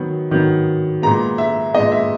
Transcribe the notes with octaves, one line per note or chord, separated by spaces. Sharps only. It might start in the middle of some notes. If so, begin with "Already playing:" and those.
Already playing: D#3 F#3 B3
D#3 F#3 B3
A#2 G#3 B3 A#5
E5
A#2 G#3 B3 D#5
E5